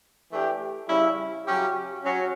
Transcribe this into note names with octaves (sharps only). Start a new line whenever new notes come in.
E3 A3 D4 G4
C#3 G3 C#4 E4
C#3 F#3 C#4 G4
F#3 C#4